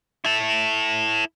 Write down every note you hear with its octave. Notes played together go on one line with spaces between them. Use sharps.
E4 A4